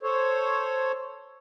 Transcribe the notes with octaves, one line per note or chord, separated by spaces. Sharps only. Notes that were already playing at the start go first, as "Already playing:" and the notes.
A4 C5 C#5